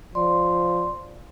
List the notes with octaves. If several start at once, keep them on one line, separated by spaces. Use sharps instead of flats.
F3 D5 C6